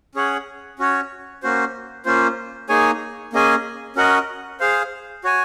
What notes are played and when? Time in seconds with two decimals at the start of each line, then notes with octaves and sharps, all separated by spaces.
0.15 C#4 G#4 C#5 F#5
0.79 C#4 F#4 C#5
1.43 A#3 C#4 F#4 C5
2.05 A#3 C#4 F4 C5
2.69 A#3 D#4 G#4 C#5 G#5
3.33 A#3 C#4 G#4 D#5 G#5
3.96 C#4 F#4 A#4 D#5 F#5
4.60 G#4 C5 F5
5.24 F#4 C#5 G#5